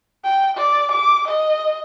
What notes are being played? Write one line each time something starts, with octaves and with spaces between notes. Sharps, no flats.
G5
D5
D6
D#5